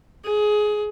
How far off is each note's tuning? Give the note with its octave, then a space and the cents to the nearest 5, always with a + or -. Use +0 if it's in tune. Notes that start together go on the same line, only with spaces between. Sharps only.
G#4 +20